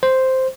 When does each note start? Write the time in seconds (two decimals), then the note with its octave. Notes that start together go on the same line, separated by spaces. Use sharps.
0.03 C5